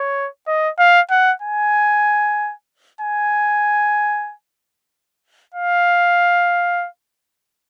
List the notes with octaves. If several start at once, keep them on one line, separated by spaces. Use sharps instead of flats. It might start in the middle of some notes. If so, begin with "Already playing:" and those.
Already playing: C#5
D#5
F5
F#5
G#5
G#5
F5